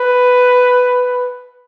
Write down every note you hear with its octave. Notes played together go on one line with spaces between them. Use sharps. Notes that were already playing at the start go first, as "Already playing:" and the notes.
Already playing: B4